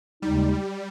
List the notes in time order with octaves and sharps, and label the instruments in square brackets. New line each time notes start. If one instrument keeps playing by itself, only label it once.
[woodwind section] D#2 C#3 G#3 D#4 [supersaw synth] G3